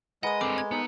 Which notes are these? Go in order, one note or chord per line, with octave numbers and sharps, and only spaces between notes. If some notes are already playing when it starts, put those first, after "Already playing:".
G#3 A#4 B4 D#5 F#5 G#5 D#6
C4 D4 A4 D6
G#6
B3 D#4 A5 E6